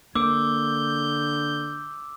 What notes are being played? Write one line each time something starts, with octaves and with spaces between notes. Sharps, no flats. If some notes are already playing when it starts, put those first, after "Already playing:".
D3 A#3 D6 E6 G6